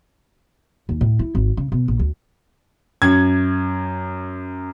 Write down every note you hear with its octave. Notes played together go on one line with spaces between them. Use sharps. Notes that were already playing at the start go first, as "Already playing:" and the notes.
D#2
A2
E4
G#1
C#3
B2
A#1
D2
F#2 G#6